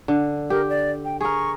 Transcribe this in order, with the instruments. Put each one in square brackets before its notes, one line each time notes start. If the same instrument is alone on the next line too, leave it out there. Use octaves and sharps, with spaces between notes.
[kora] D3
[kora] G4 [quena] A#4
[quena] D5
G5
[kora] G#4 A#4 [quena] C#6